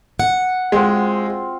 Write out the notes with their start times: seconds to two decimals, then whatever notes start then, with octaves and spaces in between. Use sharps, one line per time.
0.19 F#5
0.72 G#3 C4 F4 F#4